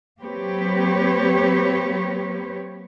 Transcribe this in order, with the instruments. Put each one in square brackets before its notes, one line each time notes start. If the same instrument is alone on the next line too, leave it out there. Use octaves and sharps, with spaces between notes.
[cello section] F#3 A#3 C4 G4 B4 C#5